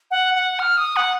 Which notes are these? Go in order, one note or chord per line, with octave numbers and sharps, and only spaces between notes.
F#5
F#5
F6
D#6
F#5